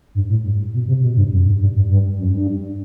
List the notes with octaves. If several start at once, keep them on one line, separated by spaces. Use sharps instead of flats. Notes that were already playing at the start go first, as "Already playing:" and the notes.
G2
A2
G2
B2
C3
B2
G2
F#2
G2
G2
G2
G2
F#2
G2